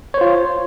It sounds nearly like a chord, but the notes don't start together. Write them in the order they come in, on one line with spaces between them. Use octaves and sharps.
C#5 C5 F4